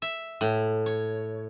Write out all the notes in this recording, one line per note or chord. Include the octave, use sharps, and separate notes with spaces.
E5
A2
C#5